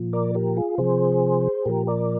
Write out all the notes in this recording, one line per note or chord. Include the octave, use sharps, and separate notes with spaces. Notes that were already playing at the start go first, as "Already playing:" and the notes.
Already playing: A#2 F3
A#4 D5
G4 A#4
F4 G#4
C3 F3 G#4 C5
A#2 F3 G4 A#4
A#4 D5